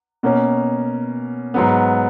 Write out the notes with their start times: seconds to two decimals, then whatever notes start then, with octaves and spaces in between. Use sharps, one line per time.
0.23 B2 A#3 C#4
1.54 G#2 F#3 B3